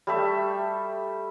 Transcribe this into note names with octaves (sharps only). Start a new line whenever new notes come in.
G3 A3 E5